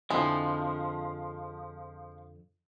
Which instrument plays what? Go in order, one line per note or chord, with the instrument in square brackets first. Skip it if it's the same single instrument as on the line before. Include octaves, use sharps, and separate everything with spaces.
[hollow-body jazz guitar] F2 D3 E4 [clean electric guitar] F3 [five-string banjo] G#3